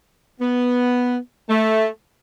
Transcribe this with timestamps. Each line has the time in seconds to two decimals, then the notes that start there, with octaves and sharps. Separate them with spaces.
0.41 B3
1.50 A3